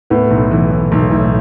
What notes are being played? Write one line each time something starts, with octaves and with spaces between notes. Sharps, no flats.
A2 B3
B1
E3
A2
B1
A2